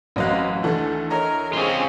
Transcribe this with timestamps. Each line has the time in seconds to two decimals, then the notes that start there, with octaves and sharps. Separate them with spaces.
0.16 A1 F#2 C4 D#5 F5 F#6
0.63 D2 D#3 E3 A3 A4 A5
1.10 A#4 C#5 D#5 A#5
1.53 C4 C#4 F4 G#4